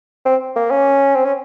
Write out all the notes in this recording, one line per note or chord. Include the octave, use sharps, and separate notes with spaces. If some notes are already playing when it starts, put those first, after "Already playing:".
C4
A#3
C#4
C4
C#4